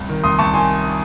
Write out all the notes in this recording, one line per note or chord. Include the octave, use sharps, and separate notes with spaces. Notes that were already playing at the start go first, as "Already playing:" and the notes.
Already playing: C2
D#3
C2 C6 D#6
C2 A5 C#6
D#3 G#5 C6